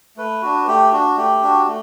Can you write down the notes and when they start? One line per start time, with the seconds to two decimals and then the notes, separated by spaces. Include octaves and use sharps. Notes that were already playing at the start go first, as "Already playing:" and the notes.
0.17 A3 B4
0.42 D4 F#4
0.67 A3 G4
0.92 D4 F#4
1.17 A3 G4
1.43 D4 F#4
1.67 A3